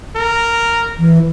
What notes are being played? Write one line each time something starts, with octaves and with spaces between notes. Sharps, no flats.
A#4
E3